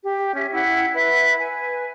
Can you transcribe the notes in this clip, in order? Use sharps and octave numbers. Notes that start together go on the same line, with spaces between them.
G4
C#4 E5
E4 F#5
B4 E5
B4 G#5